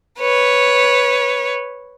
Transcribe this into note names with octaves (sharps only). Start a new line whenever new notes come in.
B4 C#5